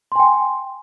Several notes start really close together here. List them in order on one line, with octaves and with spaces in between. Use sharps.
C6 G#5 G5